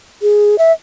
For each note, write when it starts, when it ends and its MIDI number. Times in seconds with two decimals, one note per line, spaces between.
0.22 0.58 68
0.58 0.72 76